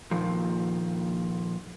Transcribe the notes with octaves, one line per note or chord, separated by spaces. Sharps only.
A#2 D#3 F3